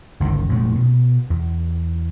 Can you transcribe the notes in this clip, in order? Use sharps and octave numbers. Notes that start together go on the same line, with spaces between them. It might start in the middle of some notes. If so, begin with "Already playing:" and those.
G1 C#2 B2 D#3
F1 A#2 G#3 A3
B2
E2